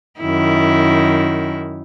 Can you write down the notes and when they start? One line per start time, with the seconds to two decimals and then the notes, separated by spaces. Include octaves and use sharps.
0.19 F#2 D#3 E4